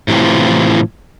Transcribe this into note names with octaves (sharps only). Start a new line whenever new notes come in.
A2 C3 E3 F3